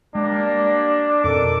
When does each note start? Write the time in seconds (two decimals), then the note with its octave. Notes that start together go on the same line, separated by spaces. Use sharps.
0.15 G3 G#3 A#3 D4
1.24 F2 B2 D#3 A4 D6